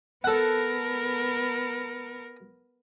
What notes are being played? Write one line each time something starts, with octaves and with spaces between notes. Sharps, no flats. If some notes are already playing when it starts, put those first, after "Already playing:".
B3 A4 A#4 F#5